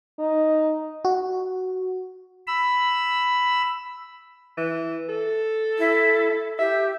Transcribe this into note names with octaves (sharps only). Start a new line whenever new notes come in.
D#4
F#4
B5 E6
E3
A4
E4
G4 E5